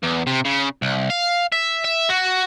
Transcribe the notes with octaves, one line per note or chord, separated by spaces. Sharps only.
E2
C3
C#3
C2
F5
E5
E5
F#4